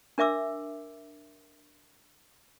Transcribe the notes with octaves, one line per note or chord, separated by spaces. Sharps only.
D4 A#4 E5 D6 E6